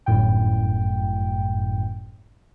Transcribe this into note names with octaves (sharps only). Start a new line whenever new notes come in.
G1 F#2 A2 G5